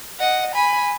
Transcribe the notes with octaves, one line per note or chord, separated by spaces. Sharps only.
D#5 F#5
G#5 B5